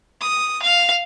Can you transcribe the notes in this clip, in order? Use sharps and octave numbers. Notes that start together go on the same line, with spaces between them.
D#6
F5